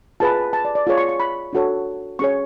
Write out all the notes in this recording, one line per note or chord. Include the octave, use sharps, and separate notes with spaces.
F4 G#4 B4 A5
A5
D5
D5
F4 G#4 C#5
C#6
C#6
B5
D4 F#4 A4 C#5
C#4 G#4 C#5 C#6